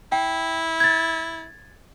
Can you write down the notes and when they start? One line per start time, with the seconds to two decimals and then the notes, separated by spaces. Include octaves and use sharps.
0.12 E4 G5
0.80 G#6 A6